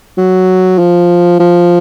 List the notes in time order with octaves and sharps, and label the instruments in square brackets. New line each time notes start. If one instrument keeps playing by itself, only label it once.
[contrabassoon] F#3
F3
F3